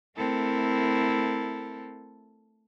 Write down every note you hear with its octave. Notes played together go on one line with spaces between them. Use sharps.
A3 C4 E4 A4 A#4